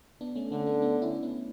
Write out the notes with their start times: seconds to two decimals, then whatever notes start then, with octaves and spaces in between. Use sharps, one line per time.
0.21 B3 D4
0.35 A3 C#4
0.52 D3 A3 C#4
0.66 B3 D4
0.82 B3 D4
1.02 C#4 E4
1.23 B3 D4